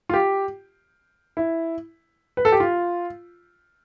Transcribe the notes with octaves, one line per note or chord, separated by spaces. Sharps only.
F4
G4
E4
B4
A4
G4
F4